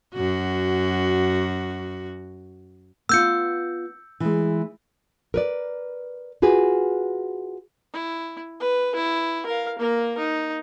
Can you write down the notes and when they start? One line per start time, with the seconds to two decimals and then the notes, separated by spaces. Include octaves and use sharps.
0.14 F#2 F#4
3.09 B3 F4 E6 G6 C#7
4.20 E3 G#3
5.34 A#4 B4 D5
6.42 F4 F#4 G#4 B4
7.93 E4
8.60 B4
8.96 E4
9.46 A#4 F5
9.79 A#3 A#4
10.18 D#4